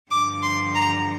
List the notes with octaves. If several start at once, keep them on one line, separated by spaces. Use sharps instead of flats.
G2 D3 F3 D6
C6
A#5